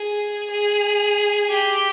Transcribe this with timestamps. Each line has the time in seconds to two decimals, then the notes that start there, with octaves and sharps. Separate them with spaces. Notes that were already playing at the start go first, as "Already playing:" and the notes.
Already playing: G#4
0.50 G#4
1.50 G4